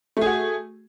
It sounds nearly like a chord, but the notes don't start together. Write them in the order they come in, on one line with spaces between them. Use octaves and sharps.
A3 G#4 F#4